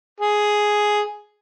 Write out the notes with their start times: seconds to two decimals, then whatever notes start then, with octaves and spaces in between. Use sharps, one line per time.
0.20 G#4